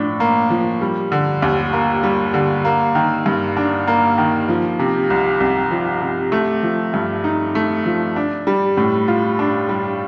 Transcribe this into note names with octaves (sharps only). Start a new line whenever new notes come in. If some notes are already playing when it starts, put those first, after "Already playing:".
Already playing: A2 F3 D4
A#3
F3
G3
D3
D#2
A#3
G3
D3
A#3
D#3
G2
D4
A#3
D#3
F3
C3
C2
C2
F3
C3
A3
F3
G2
D#4
A3
F3
D4
G3
A2
F4
D4
G3